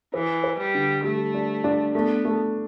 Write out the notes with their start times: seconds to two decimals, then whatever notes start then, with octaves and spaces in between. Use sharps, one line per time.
0.14 E3 B4
0.44 B4
0.59 G3
0.75 D3
1.04 G3 A3
1.34 D4
1.64 D4
1.95 A3 B3
2.25 A3